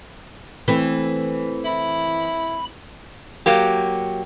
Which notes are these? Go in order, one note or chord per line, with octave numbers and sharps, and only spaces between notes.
E3 A3 C4
E4 B5
F#3 A#3 G4